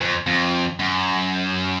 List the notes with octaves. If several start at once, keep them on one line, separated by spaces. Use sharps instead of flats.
F2
F2
F#2